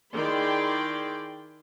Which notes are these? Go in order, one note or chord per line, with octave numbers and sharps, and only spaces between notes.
D#3 E4 G#4 D5 G5 C6